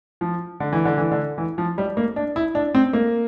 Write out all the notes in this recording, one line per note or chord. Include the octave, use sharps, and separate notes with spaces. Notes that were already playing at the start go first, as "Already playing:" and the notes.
F3
D3
E3
D3
E3
D3
E3
F3
G3
A#3
D4
E4
D4
C4
A#3